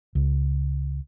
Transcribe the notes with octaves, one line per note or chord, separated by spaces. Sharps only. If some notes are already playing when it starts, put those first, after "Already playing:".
C#2